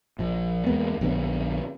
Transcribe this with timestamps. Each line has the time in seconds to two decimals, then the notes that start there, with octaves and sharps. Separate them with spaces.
0.19 A#1 F3
0.67 E2 G#3 A#3 B3
1.01 A#1 D3 B3 C#4